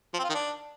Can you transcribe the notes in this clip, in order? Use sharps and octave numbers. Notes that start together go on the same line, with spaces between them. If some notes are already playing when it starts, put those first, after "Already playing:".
F3
C4
F4
D#3
D4